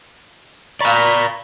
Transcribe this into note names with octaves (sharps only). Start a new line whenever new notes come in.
D5 F5 A#5 B5 C#6